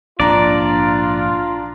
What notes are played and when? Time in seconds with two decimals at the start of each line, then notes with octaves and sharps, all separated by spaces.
0.20 A#1 G#2 D4 F4 D5 A#5